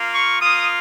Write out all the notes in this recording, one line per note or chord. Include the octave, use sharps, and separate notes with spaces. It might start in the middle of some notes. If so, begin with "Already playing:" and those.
Already playing: A#3 F4
C#6
A#3 F4 D#6